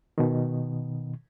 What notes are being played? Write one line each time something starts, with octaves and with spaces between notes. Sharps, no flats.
B2 D#3